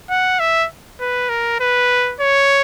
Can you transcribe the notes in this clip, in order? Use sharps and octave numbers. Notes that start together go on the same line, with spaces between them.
F#5
E5
B4
A#4
B4
C#5